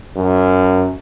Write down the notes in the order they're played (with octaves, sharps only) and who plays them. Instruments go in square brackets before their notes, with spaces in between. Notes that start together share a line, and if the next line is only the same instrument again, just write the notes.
[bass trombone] F#2